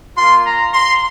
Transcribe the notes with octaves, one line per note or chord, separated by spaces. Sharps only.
A#3 F4 C6
A#5
C6